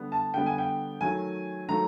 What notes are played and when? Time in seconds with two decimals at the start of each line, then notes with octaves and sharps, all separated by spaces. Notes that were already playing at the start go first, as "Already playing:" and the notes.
Already playing: D3 G3 B3
0.12 A5
0.34 D3 G3 B3 G5
0.46 G#5
0.58 G5
1.01 D#3 F#3 A3 G#5
1.69 D#3 F#3 A3 A#5